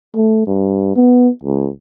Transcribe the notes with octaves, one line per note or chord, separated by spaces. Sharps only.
A3
G2
B3
C#2